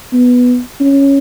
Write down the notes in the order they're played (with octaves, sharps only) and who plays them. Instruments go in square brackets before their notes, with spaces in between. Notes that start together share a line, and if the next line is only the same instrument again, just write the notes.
[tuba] B3
C#4